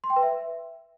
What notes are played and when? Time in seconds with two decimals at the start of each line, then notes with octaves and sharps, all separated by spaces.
0.04 C6
0.10 G5
0.16 B4
0.23 E5